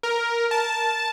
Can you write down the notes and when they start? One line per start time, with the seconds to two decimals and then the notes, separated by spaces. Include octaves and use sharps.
0.03 A#4
0.51 A5